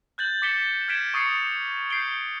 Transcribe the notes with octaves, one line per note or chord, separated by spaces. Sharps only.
F#6 G6 A6 F#7
D6 A6 B6 C#7 E7 G7
F6 G#6 B6 D7 E7 G7
C#6 D#6 A6 C7 C#7
G6 C7 D7 G7